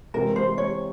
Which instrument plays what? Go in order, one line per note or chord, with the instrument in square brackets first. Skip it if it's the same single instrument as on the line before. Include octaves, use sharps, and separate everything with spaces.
[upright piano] C3 E3 G#3 C4 F4 [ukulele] A#4
[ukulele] C5
C#5